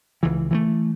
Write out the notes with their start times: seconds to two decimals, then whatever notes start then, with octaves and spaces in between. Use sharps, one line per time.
0.23 C#2 E3
0.51 E3 F3 A3